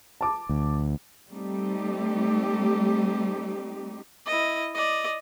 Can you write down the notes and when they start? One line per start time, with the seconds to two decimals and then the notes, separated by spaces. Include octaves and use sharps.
0.21 A5 D6
0.49 D2
1.30 G3 A3 C4 D#4 G4
4.26 E4 D#5
4.75 D5 D#5